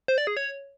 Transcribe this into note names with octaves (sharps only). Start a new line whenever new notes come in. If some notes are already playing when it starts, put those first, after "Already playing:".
C5
D5
G#4
C#5